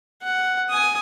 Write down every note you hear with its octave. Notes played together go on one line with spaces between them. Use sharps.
F#5
G#5 D#6